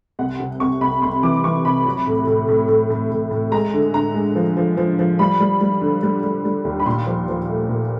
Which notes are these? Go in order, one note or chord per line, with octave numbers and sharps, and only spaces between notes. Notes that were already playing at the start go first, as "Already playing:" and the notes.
C2 F#5
C3
C2 C#6
C2 B5
C2 C6
E3 D6
E3 C#6
C3 B5
F#3
A2
A2
A2
A2
A2
A2
A2
G#3 A#5
D3
D3 A#5
G#3
F3
F3
F3
F3
G3 B5
G3
G3
D3
G3
G3
G3
D#2
B5
A#2 C6
F3
F3
A3
A#2